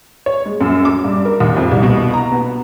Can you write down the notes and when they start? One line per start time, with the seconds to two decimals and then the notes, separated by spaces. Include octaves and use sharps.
0.26 C#5
0.45 G#3
0.61 F#2
0.85 D6
1.05 G2
1.25 A#4
1.40 D#2
1.57 F2
1.71 C2
1.83 B2
2.14 A#5
2.32 B3